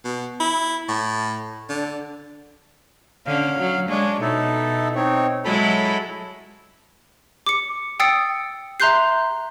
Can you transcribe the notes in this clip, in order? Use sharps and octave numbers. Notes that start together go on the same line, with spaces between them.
B2
E4
A2
D3
D3 C#4 F5
F#3
G#3 D4 C#5
B2 D#4 E4 A4
C4 D#4 C#5
F#3 G#3 E4 A4 B5
D6 C#7
G5 D#6 E6 A6 C7 C#7
E5 A#5 C6 F#6 G6 C7